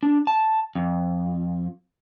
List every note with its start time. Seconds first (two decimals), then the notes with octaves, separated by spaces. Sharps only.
0.03 D4
0.27 A5
0.75 F2